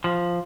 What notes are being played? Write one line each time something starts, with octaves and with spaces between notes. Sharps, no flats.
F3